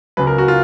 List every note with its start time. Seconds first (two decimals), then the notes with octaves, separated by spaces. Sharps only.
0.17 C#2 C#3 F#3 B4
0.27 A#4
0.38 F#4
0.48 F4